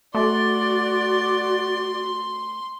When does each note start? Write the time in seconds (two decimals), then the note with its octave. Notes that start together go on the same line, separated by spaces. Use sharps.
0.15 A3 F#4 D5 C6